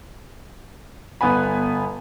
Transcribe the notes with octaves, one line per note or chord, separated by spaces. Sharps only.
G1 B3 B4 G#5 B5